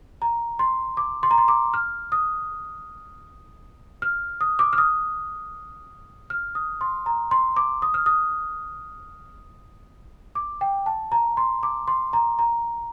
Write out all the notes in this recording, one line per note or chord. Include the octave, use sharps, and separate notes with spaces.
A#5
C6
D6
C6
A#5
C6
D6
F6
D#6
F6
D#6
D6
F6
D#6
F6
D#6
C6
A#5
C6
D6
D#6
F6
D#6
D6
G5
A5
A#5
C6
D6
C6
A#5
A#5